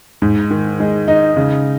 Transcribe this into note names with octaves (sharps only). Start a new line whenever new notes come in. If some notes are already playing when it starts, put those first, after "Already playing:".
G#2
D#3
G#3
D#4
C#3